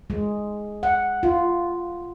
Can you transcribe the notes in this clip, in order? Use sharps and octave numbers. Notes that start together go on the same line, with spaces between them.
G#3
F#5
F4